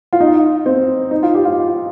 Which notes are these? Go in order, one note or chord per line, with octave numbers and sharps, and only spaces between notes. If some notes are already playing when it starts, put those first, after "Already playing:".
F4
D#4
C4
D#4
F4
G4
F4